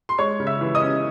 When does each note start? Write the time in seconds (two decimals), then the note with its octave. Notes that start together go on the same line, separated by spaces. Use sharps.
0.09 C6
0.18 G#3 C#5 C#6
0.40 C#3
0.47 E5 E6
0.61 E3
0.75 D#5 D#6
0.82 C#4